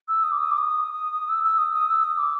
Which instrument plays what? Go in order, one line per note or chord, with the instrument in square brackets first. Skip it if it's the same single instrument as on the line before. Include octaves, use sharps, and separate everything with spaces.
[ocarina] E6
D#6
D6
D#6
D6
D#6
E6
E6
D#6
D#6
E6
D#6
D6